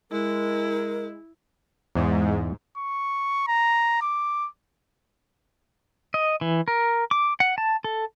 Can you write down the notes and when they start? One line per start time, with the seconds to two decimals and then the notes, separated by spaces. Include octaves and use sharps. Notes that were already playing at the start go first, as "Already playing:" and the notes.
0.11 G#3 E4 A#4
1.95 E2 G#2
2.78 C#6
3.48 A#5
4.02 D6
6.14 D#5
6.41 E3
6.68 A#4
7.11 D6
7.40 F#5
7.58 A5
7.84 A4